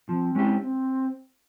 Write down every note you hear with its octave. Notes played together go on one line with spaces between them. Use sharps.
F3 C4
G#3 C#4 E4 G4
C4